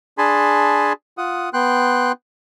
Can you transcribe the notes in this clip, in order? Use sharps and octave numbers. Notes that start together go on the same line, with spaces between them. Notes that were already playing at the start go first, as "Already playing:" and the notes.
D4 G#4 G#5 A5 B5 C6
F4 F#5 D#6
B3 G5 C6 F#6